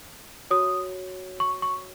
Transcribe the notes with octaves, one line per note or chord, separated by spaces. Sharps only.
F#4 C#5 D#6
C#6
C#6